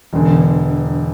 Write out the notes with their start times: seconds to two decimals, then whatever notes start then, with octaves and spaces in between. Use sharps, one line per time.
0.13 E1 E2 D3